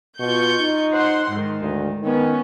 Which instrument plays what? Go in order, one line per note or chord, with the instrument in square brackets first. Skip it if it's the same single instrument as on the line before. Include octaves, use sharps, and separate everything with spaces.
[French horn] B2 [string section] F4 C#6 G6
[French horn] D#4
[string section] C5 F#5 C6
G#2 D#3
[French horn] D2
[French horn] D#3 [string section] B3 C#4